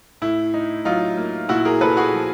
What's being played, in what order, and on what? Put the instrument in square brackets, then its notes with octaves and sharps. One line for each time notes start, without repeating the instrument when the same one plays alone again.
[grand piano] A2 E4
D#4
F#3 D#4 F4
A#3
A#2 E4 F#4
G#4 A#4
A#2 A4 B4
F#4 G#4
F3